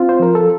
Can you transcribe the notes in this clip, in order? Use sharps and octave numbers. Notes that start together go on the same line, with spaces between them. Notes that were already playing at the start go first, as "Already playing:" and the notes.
Already playing: C4 F4
C5
F3 A#4
A4